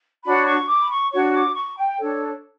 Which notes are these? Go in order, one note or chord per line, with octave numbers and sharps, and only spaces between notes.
D4 F#4 C#5 B5
C#6
D6
B5
C#6
D4 F#4 C#5 C#6
D6
C#6
G5
D4 A4 C#5